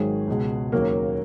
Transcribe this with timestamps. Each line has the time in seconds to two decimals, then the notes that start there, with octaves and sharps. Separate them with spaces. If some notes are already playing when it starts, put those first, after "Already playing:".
Already playing: G#1 G#2 D#3 F#3 G#4
0.27 C#2 B2 G#3
0.72 D#2 C#3 F#3 A#3 A#4